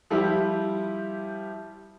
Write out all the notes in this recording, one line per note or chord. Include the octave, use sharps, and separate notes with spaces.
F3 G3 E4 G4